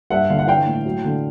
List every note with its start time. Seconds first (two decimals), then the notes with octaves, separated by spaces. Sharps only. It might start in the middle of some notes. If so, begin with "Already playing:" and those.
0.10 G2 E5 F#5
0.30 D3 F5
0.39 F#5
0.47 E3 F5 G5
0.66 A2
0.85 F#3
1.04 D3